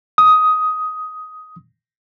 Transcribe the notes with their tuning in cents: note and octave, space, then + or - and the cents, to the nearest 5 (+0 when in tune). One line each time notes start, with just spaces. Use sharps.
D#6 +10